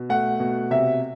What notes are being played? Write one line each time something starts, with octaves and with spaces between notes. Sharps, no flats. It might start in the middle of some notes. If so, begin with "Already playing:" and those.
Already playing: B2
A3 F#5
B2
C3 E5